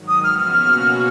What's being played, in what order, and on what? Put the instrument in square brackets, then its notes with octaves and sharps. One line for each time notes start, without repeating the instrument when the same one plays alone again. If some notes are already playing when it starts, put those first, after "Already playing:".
Already playing: [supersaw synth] G#2 D#3 F#3
[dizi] D#6
[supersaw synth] C#3 F3 B3 F#4 [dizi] F6
[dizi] F6
[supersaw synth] B2 A#3 C#4 F#4